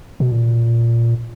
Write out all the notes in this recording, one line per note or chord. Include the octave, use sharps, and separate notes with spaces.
B2
A#2